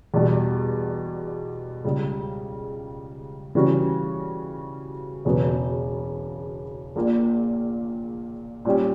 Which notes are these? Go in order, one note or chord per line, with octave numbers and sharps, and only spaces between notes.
E2 B2 G3
C#2 C#3 G3
C#3 E3 G3 C#4 F#4
E1 E2 C#3 F#3 B3
A#1 A#2 A#3
A#2 G3 C#4 G4